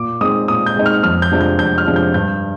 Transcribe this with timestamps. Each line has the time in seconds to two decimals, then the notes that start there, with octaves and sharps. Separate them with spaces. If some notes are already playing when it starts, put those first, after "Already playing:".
Already playing: A#2 D6
0.21 G#3 C4 D#4 D#6
0.48 A#2 D#6
0.66 G6
0.76 G#3 C4 D#4
0.86 F6
1.03 F2 F6
1.22 G6
1.31 C3 F3 G#3 D4
1.41 G6
1.59 F2 G6
1.78 F6
1.87 C3 F3 G#3 D4
1.96 G6
2.14 G2 G6